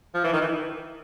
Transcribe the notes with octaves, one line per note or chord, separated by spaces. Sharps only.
F3
E3
D#3
E3